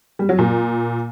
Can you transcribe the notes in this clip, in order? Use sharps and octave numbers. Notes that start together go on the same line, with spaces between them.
G3
F#3
A#2